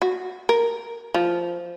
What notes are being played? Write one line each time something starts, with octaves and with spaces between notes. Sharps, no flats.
F#4
A#4
F3